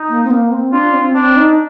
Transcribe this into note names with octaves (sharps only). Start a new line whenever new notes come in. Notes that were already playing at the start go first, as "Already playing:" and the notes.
Already playing: D#4
A#3
C4
A#3
C4
D4 F4
C4
C4 D4
D#4